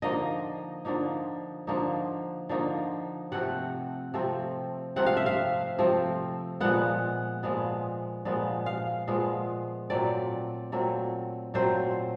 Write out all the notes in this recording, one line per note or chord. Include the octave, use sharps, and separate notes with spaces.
D3 F3 A#3 D#4 D#5
D3 F3 A#3 D#4
D3 F3 A#3 D#4
D3 F3 A#3 D#4
C3 F3 A3 C4 F#5
C3 F3 A3 C4
C3 F3 A3 C4 F#5
F5
E5
F5
C3 F3 A3 C4
A#2 F3 G#3 B3 F#5
A#2 F3 G#3 B3
A#2 F3 G#3 B3
F5
A#2 F3 G#3 B3
A#2 F#3 A3 C4 D5
A#2 F#3 A3 C4
A#2 F#3 A3 C4 C5